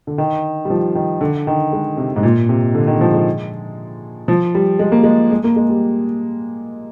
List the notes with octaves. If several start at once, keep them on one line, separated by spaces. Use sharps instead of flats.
D3
D#3
G3
F3
D#3
D3
D#3
G#3
C3
G#2
A#2
C3
D3
D#3
F3
G#3
F3
G3
G#3
A#3
G#3
G#3
A#3
G#3
G3